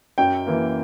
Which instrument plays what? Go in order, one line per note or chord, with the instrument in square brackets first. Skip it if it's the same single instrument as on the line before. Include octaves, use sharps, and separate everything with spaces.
[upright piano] F#2 G5
E3 A#3